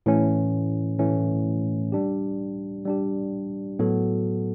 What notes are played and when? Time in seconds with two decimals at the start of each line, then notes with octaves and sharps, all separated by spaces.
0.06 A2 E3 A3 C#4
0.99 A2 E3 A3 C#4
1.92 G3 D4 G4
2.85 G3 D4 G4
3.79 A2 F#3 B3 F#4 A4